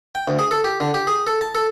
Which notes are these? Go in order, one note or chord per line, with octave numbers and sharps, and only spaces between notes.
G5
D2
G#4
A4
G4
D3
G4
G#4
A4
A5
A4